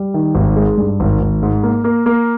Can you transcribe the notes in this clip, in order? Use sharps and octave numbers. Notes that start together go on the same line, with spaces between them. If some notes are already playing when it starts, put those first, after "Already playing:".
Already playing: G3
D#3
G#1
G#3
G2
G#1
G#1
G#2
A#3
A#3
A#3